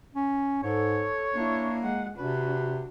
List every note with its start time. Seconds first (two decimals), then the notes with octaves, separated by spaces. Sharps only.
0.15 C#4
0.63 G#2 A4 C#5
1.34 A#3 D4 E4
1.82 G#3 F#5
2.18 C3 D4 F#4 B4